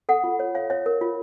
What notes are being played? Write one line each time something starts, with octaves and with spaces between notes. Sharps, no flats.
A4 F#5
F4
C#5
C#5 F5
C#5 E5
A#4
F4